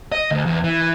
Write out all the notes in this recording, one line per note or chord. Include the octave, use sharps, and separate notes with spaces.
D#5
D2
E2
E3